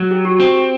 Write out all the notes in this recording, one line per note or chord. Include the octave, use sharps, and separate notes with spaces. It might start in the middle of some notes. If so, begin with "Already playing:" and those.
Already playing: F#3
G4
F#4
C4
G4